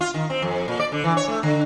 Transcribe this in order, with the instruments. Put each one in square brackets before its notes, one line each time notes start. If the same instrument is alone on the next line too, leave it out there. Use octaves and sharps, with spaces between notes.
[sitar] F4
D#3
C4
F2
A#2
D5
D3
E3
C#5
A3
D3